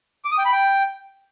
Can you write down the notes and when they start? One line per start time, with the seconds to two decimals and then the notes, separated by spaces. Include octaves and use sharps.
0.25 D6
0.32 D#6
0.38 G5
0.45 B5
0.52 G5